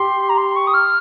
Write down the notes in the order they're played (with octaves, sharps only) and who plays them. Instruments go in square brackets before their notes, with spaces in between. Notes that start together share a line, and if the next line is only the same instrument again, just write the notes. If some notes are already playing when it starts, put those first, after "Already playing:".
Already playing: [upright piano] G4 [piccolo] C6
[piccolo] A#5
C6
C#6
D#6
F6